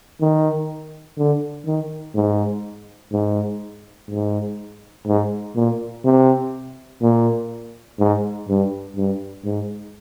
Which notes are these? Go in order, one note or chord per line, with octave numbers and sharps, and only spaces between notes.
D#3
D3
D#3
G#2
G#2
G#2
G#2
A#2
C3
A#2
G#2
G2
G2
G#2